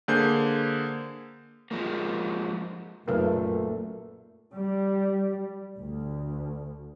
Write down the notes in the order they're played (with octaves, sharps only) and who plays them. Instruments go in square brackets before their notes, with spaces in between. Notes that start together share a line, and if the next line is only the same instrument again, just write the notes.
[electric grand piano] D3 A#3 G#4 C5 G6
[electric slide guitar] F3 G#3 A#3
[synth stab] B1 C#3 [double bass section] F#2 [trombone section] A#2 A3 [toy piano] A#4 B4 D#5
[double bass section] G3
D2